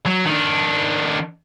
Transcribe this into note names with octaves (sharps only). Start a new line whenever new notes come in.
F#3
D#3 D4